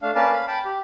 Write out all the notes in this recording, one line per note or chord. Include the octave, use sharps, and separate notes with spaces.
A3 D4 F5
A#3 C#4 B4 D5 F5 A5
F5 B5
G5 A5 B5
G4